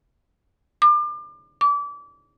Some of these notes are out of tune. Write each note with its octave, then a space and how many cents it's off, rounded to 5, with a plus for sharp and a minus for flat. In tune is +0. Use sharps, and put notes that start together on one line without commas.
D6 +35
D6 -30